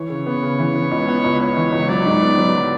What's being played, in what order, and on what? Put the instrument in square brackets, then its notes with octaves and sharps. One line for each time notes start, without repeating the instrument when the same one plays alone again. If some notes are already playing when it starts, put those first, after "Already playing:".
Already playing: [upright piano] E3 [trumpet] C#5
[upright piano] C#3
B3
C#3
E3
B3
C#2
B3
C#2
[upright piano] B3 [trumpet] C#5
[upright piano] E3
C#2
[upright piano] F#3 [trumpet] D5
[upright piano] G#2
B3
F#3
F#3